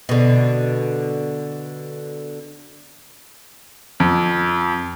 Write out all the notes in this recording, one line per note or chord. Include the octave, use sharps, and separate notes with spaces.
B2 D3
F2